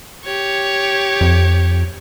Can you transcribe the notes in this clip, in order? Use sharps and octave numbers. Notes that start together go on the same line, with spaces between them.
G4 C#5
F2